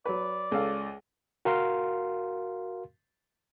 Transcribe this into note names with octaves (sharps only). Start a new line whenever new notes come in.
F#3 B4 D5
C#2 A4 F5
F#4 A#4 F5 C6